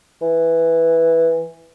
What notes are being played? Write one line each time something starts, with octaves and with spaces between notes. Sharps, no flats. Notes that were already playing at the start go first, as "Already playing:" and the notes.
E3